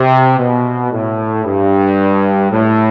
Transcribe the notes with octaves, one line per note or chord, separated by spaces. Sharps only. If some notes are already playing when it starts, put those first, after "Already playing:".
Already playing: C3
B2
A2
G2
A2